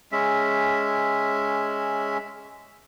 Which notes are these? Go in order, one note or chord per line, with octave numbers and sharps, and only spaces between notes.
G#3 C#4 E5